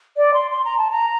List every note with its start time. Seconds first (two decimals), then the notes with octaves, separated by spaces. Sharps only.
0.16 D5
0.33 C6
0.51 C6
0.64 A#5
0.78 A5
0.91 A#5